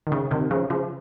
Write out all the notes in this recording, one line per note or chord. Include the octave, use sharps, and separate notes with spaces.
D#3
C#3
C3 D#3
C#3 F3
C#3 F3